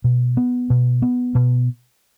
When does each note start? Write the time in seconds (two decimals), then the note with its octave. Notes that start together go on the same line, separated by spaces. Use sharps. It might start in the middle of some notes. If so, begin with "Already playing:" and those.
0.04 B2
0.37 B3
0.70 B2
1.02 B3
1.35 B2